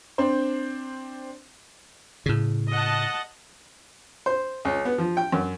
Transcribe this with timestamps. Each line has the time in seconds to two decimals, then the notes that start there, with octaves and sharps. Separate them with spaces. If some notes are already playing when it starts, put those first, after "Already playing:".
0.18 C4 D4 C5
2.26 A2 C#3
2.69 D#5 F#5 A5
4.26 C5
4.65 C#2
4.85 B3
4.98 F3
5.17 G5
5.32 F#2